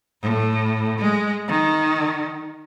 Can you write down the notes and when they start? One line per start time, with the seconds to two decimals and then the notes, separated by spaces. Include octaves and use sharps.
0.23 A2
0.99 G#3
1.48 D#3